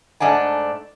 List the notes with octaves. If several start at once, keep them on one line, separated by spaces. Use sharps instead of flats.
G#2 A3 D4 F#5 G#5